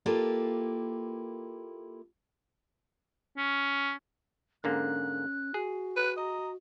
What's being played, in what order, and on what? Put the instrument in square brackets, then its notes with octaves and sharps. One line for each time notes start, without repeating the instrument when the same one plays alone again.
[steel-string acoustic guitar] A#3 E4 F4 G4 A4 B4
[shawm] C#4
[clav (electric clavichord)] G#2 D3 A#3 [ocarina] C#4 [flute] F#6
[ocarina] F#4 [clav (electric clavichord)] G#4
[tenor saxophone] B4 [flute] F#6
[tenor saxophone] D#5 [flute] A#5